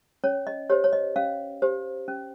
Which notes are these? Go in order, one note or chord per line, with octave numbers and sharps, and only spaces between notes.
C#4 C#5
D#5
G4 C5 C#5
C#5
D#5
C#4 F5
G4 C5
C#4